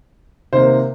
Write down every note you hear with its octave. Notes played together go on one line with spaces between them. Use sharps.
C3 D#3 A#3 C5